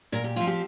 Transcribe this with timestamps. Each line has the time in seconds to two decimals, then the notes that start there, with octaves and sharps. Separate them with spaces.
0.12 A#2 A#4
0.24 G4
0.36 F3 C4 F4
0.47 G4